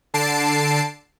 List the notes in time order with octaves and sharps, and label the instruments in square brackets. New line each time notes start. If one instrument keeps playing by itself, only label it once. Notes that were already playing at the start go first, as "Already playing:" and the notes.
[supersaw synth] D3 A5 C7 D7